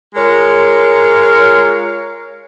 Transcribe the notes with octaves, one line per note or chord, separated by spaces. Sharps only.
G#3 F4 A#4 C#5